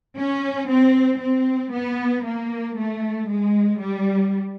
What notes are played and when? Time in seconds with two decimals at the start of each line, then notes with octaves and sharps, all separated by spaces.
0.17 C#4
0.69 C4
1.20 C4
1.73 B3
2.26 A#3
2.78 A3
3.29 G#3
3.81 G3